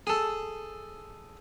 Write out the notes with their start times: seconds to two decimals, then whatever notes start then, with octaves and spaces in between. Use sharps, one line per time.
0.07 G#4 A4